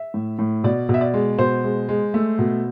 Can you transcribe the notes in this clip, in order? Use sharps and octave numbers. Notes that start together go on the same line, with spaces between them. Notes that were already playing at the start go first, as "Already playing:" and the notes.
Already playing: E5
A2
A2
B2 D5
B2
E5
D5
G#3
B2 C5
G#3
G#3
A3
B2